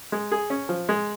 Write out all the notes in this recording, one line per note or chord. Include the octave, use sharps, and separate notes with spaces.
G#3
G#4
C#4
F3
G#3